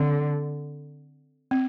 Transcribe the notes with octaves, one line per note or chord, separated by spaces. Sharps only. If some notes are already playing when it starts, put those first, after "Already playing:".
Already playing: D3 C4
C4